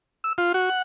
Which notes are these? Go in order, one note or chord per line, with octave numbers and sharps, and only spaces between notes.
E6
F4
F#4
F#5